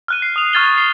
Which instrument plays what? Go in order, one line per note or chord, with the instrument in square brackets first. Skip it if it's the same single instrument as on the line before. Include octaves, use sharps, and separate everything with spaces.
[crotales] F6 F#6 D#7
C7
D#6 F7
C#6 F6 G#6 A6 F7 G7
C7